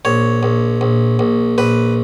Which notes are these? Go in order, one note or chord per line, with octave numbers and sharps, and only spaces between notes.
A#1 C#5
A#1
A#1
A#1
A#1 B4